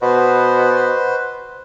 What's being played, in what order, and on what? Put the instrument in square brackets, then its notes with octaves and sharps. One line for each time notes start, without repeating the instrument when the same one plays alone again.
[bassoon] B2 [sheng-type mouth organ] B4 C5